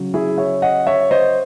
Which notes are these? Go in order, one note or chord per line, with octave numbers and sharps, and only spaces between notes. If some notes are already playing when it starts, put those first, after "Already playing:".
Already playing: C#3 F#3
E4 G#4
C#5 E5
D#5 F#5
C#5 E5
C5 D#5